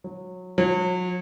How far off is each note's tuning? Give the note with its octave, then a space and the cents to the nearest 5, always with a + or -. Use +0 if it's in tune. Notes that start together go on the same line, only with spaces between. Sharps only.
F#3 -20
F#3 -35